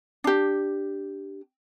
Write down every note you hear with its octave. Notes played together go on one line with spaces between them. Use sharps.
D4 G4